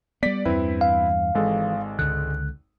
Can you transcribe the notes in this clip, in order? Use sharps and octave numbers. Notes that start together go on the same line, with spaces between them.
G3 B3 D5 B6
E2 G2 E3 C4 E4 B4
F5
G#1 E3 G#3 A4
C#2 D3 F#6